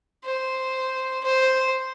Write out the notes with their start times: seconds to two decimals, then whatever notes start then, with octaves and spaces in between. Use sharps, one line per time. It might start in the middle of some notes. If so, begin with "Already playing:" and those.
0.25 C5
1.23 C5